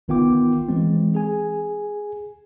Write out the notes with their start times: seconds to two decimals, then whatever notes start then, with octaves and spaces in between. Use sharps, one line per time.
0.08 G#1 D#3 B3 F4 G5 D6
0.69 E3 G#3 C4
1.15 G#4 G#5